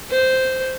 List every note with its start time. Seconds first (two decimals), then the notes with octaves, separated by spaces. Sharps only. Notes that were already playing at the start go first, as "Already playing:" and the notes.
0.11 C5